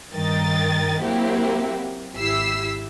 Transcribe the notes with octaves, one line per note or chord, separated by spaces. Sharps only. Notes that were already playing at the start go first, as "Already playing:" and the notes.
G2 D#3 A#4 D#5 G5 A6
F#3 A#3 C4 E4 F#4 G4
G#1 E4 G4 E6 B6 C7